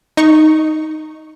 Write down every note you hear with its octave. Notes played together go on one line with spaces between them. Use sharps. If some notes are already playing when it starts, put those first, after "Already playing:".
D#4 C#6